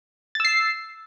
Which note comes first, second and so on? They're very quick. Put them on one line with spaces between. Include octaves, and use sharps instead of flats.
A6 E6 C7